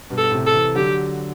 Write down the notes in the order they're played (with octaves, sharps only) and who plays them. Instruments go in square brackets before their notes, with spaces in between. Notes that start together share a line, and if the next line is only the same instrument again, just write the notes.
[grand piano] G2 B2
[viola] A4
[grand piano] A2 C3
[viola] A4
[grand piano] C3 E3
[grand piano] D3 F#3 [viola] G4